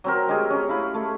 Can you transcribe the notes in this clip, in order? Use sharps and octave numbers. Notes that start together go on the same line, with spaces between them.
F#3 C4 A#4
G#3 D#4 G4 G#4
C#4
E4 F5 B5
A3